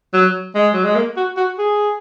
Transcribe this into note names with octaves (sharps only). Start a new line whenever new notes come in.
F#3
G#3
F#3
G#3
A#3
F#4
F#4
G#4